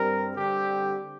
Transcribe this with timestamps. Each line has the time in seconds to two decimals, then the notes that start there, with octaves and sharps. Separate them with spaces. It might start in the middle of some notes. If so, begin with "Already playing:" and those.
Already playing: G2 G3 C4 A#4
0.36 D3 G3 C4 G4